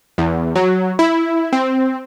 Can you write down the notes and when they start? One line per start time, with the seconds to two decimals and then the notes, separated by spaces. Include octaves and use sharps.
0.18 E2
0.55 F#3
0.99 E4
1.53 C4